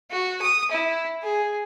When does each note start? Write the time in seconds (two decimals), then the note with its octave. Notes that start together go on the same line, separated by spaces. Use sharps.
0.11 F#4
0.42 D#6
0.71 E4
1.23 G#4